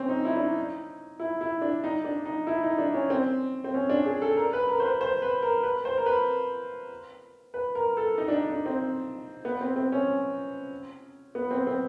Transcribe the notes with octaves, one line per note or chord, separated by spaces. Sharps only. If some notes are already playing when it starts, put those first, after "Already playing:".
Already playing: C4 C#4
D#4
E4
D4
D#4
E4
E4
D4
D#4
D4
D#4
E4
D#4
D4
C#4
C4
C4
C#4
D4
G#4
A4
A#4
B4
A#4
C5
B4
C5
B4
A#4
B4
C5
A#4
B4
B4
A#4
A4
D#4
D4
D#4
D4
C4
B3
C4
C4
C#4
B3
C4
C4